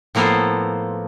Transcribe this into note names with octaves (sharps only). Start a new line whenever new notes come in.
A2 F3 A#3 B3 A4 C5